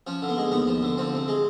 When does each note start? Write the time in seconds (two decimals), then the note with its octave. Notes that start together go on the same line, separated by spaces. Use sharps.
0.07 F3 C#4
0.22 D3
0.29 B3
0.38 G#3
0.52 D#2 B3
0.67 F3
0.83 D3
0.97 F3 C4
1.13 C3
1.28 G#3